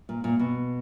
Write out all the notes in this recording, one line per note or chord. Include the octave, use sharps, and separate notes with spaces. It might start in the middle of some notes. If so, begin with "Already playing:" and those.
A#2
A#2
B2